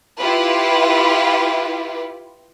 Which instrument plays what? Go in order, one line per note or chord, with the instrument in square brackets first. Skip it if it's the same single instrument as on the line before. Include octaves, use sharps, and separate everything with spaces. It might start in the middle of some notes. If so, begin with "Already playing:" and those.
[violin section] E4 F4 G4 B4